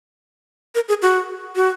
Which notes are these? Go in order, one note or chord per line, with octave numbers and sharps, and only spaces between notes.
A#4
G#4
F#4
F#4